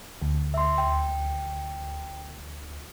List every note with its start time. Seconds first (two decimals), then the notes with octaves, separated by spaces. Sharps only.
0.22 D2
0.54 E5 C6
0.78 G5